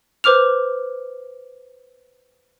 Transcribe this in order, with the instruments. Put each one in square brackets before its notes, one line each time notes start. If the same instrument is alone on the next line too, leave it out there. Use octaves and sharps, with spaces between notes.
[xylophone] B4 C5 D6 F6 F7